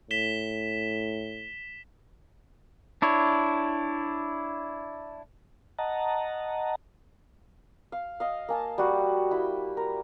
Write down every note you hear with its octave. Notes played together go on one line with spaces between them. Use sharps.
A2 B6 E7 G7
D4 E4 C#5
D#5 F#5 A5 A#5
F5
D#5 F5
A#3 G#5 A5
G3 F#4
E4 G5
A#4